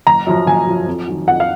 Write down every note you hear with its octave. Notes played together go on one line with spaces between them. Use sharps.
F#1 A#5
F#2 F3
F#1 G#5
F#2 F3
F2
D#3 F#3
F2 F#5
F5